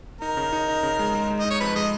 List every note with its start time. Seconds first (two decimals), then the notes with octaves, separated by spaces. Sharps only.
0.21 D#4 A#4
0.37 C#3
0.53 D#4
0.68 D#4
0.83 C#3
0.99 G#3
1.15 G#3
1.30 G#3
1.40 D#4 D#5
1.50 C#5
1.60 F2 B4
1.76 G#3 D#5